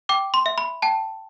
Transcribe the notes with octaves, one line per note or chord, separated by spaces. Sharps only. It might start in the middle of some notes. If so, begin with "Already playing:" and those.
G5 D6
C6
E5
B5
G5 A5